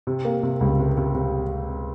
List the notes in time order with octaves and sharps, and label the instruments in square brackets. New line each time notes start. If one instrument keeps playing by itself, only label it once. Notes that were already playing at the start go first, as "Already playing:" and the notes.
[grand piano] C3
A#3
C3
C#2
C3
C3
C3